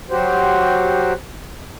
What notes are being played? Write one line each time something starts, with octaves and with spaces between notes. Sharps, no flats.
F#3 F#4 G4 C5